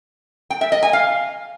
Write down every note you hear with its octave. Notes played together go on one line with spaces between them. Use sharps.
G5
E5
D#5
G#5
F5